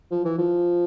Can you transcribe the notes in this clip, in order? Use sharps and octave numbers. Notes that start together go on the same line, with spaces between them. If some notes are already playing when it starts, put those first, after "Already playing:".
F3
E3
F3